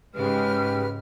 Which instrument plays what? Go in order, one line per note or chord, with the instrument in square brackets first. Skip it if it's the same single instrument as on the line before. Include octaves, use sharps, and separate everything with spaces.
[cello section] G#2 C#3 G#3 [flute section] G4 B4 F6